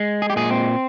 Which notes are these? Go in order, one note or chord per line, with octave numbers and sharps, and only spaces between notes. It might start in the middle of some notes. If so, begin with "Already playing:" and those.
Already playing: G#3
G#4
G4
A#2 G#4
C4